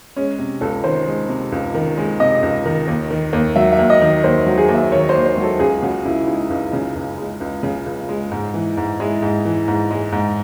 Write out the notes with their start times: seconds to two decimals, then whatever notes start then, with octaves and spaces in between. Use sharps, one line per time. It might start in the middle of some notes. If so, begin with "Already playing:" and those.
0.16 G#3 C#4
0.39 C3
0.61 C#2 A4
0.84 D#3 C5
1.07 G#3
1.29 C3
1.52 C#2
1.74 D#3
1.97 G#3
2.20 C3 D#5
2.42 C#2
2.66 D#3
2.88 D#2
3.11 D#3
3.33 D#2
3.56 F#3 E5
3.73 E5
3.79 D#2
3.90 D#5
4.01 D#3
4.24 D#2 C5
4.46 F#3
4.58 G#4
4.69 D#2
4.75 E5
4.92 D#3 C#5
5.09 C5
5.14 D#2
5.26 C5
5.38 F#3
5.43 A4
5.60 C#2 G#4
5.82 C#3 F#4
6.05 C#2 E4
6.27 G#3 D#4
6.50 C#2
6.73 C#3
6.96 C#2
7.18 G#3
7.41 C#2
7.63 C#3
7.86 C#2
8.09 G#3
8.31 G#2
8.54 E3
8.77 G#2
9.00 G#3 E4
9.22 G#2
9.45 E3
9.68 G#2
9.90 G#3
10.12 G#2